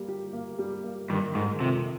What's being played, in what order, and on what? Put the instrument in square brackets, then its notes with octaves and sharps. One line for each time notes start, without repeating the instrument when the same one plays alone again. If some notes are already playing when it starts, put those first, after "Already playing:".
Already playing: [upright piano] G3 A#3
G4
A#3
G3
A#3
[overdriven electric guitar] G2 [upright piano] D#3
[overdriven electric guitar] G#2 [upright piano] D#3
[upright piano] F2 [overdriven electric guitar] C3